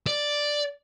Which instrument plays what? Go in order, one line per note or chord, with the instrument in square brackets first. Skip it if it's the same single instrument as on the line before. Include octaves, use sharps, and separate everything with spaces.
[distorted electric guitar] D5